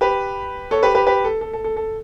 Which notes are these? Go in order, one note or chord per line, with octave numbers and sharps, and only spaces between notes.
G4 B4
A4 C#5
G4 B4
G4 B4
G4 B4
A4
A4
A4
A4
A4